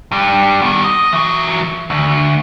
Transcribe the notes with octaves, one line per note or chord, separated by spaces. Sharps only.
G2 G3
B2 D#3
D#5
E3 F#3
D2